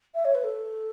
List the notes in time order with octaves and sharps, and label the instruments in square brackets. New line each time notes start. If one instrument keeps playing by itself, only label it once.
[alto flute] E5
C#5
B4
A4